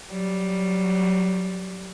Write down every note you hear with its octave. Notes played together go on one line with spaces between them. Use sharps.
F#3 G3